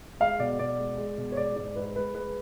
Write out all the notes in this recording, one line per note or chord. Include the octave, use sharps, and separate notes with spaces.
G#3 F5
B2 D5
B2 D5
G#3
G#3
B2
C#5
G#3 D5
G#2 D5
G#2 B4
G#3 B4
G#3 B4